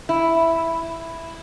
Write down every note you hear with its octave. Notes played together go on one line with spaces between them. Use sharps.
E4